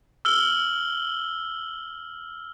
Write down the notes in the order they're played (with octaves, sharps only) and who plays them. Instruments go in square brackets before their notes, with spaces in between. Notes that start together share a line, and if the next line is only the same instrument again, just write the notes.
[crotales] E6 F6 G7